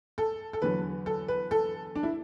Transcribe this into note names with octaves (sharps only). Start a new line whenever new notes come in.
A4
A4
E2 D3 F#3 B4
A4
B4
A4
D4
E4